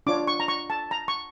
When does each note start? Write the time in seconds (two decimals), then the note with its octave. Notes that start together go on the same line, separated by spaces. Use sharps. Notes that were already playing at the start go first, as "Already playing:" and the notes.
0.07 D4 F4 C#5 D6
0.27 C#6
0.40 A#5
0.48 C#6
0.70 A5
0.91 A#5
1.08 C#6